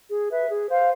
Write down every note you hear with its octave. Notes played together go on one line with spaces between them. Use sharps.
G#4
B4 E5
G#4
C5 F5